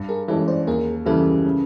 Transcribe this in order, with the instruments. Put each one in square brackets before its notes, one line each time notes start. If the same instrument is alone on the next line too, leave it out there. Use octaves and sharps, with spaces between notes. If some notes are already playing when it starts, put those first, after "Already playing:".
Already playing: [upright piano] G2
[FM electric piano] G#4 A#4
[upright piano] E3 G#3 C#4 [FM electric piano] G4 A4
[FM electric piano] C5 D5
[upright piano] D#2 [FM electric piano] G#4 A#4
[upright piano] C#3 E3 G3 [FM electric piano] A4 B4
[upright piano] C#3